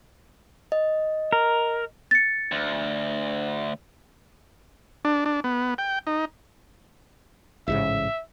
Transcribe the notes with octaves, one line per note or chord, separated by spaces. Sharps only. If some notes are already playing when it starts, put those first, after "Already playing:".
D#5
A#4
A6 C#7
D2
D4
D4
B3
G5
D#4
A1 G#2 C#3 E5